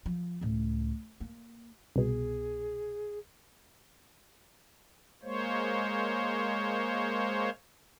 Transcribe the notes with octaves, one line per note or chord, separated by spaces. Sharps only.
F3
C#2 A2
A#3
C2 B2 G#4
G#3 A#3 C5 C#5